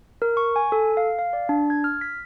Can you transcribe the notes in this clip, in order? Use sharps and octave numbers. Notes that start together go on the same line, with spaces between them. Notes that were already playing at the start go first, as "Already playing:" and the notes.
A#4
C#6
G#5
A4
F5
F5
D5
D4
G#6
F6
B6